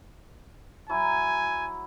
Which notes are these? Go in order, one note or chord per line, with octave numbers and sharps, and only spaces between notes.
F#3 E4 G#5